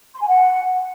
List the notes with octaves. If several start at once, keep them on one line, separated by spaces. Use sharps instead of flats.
C6
G#5
F#5